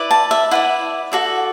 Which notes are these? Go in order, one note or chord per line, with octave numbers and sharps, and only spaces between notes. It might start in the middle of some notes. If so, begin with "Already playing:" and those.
Already playing: E4 B4 D5
A5
E5
E4 B4 D5 F#5
F#4 A4 D5